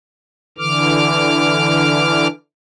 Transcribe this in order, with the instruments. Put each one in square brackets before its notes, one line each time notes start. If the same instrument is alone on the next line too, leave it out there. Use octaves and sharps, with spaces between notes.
[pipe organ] D3 E3 D6 F6